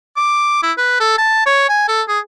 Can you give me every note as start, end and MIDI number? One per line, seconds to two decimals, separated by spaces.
0.17 0.61 86
0.63 0.72 64
0.77 1.00 71
1.00 1.16 69
1.18 1.45 81
1.46 1.64 73
1.69 1.83 80
1.88 2.02 69
2.08 2.19 68